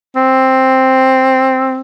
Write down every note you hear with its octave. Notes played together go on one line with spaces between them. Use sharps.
C4